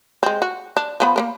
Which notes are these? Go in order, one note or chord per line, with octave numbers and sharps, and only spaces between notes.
G#3 C4
F#4
D4
F3 B3 B5
A#3 B3 A#4